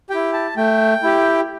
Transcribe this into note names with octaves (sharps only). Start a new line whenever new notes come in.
E4 G4 G5
A5
A3 G5
E4 G4